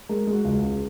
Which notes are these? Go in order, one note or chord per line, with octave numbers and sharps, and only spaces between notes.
G#3 A#4
G#3
F#4
C#2
C#3